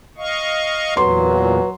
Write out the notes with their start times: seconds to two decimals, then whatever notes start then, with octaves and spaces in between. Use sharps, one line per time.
0.18 D#5 F5 C#6
0.97 E2 A#2 F#3 B4 C6